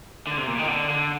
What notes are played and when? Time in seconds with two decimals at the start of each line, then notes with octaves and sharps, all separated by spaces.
0.27 D3
0.38 C3
0.47 A#2
0.58 D#3
0.68 D3
0.89 D3